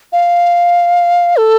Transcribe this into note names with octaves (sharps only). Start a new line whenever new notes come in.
F5
A4